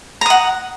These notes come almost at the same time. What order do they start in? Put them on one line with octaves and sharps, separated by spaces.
A#5 D#6 F#5